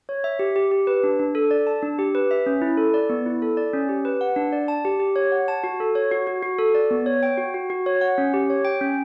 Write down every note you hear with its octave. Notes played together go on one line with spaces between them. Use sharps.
C#5
E5
G4
G4
G4
B4
D4
D4
A4
D5
A5
D4
G4
B4
E5
C#4
E4
A4
D5
B3
E4
A4
D5
C#4
G4
B4
F#5
D4
D5
A5
G4
G4
C#5
F#5
A5
F#4
A4
C#5
F#4
F#4
F#4
A4
D5
B3
C#5
G5
F#4
F#4
F#4
C#5
F#5
C#4
G4
C#5
G5
C#4